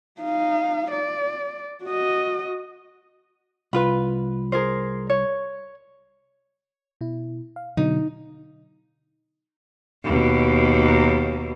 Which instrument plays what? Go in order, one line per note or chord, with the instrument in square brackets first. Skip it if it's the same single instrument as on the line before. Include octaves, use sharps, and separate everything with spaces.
[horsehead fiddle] D#4 F5
D5
F#4 D#5
[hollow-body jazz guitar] C2 F4 B4 [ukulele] B5
[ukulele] G#4 A#4 C5
C#5
[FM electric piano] B2 E4
F5
[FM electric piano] B2 D3 F#3 [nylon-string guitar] D#4
[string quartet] D#2 B2